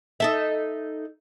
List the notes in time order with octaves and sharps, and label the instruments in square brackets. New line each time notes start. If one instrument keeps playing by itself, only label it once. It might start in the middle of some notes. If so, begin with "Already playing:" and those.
[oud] D#4 A4 E5